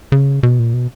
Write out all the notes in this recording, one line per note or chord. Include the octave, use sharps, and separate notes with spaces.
C#3
B2
A#2
B2